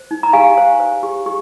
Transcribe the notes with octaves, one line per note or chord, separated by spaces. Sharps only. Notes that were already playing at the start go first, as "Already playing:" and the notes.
Already playing: C5
D#4
A#5
G4 F5 G#5
C5
C5
G4
G4